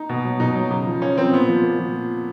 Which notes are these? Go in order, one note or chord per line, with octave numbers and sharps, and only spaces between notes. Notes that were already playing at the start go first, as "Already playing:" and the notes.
Already playing: D#4
B2
F#3
B2 D#4
F#3
C#3
F3
C#3 C#4
F3 C4
A#2 B3
F3
A#2
F3